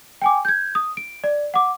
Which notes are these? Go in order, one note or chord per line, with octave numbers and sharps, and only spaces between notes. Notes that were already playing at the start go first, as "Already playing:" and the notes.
G5 G#5 D6
G6 G#6
D#6
D7
D5
F#5 D6